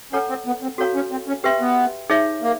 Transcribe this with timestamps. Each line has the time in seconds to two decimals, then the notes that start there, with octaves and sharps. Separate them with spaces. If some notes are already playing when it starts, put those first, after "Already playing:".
0.13 C#4 A4 C#5 F#5 A#5
0.29 C4
0.47 B3
0.62 C4
0.78 C4 F#4 A4 C#5 F5 A#5
0.95 C#4
1.11 C4
1.28 C#4
1.43 C4 G4 B4 E5 G5 C6
1.61 B3
2.10 D#4 G#4 C#5 E5
2.42 A#3